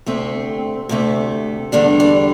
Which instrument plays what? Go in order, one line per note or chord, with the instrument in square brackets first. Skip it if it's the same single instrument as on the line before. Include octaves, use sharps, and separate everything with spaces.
[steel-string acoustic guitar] D2 C3 A3 C4
D2 C3 A3
E2 D3 G3 D4
D4